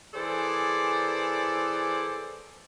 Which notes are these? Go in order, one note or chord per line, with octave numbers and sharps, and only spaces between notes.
E3 G#4 A4 C5 D5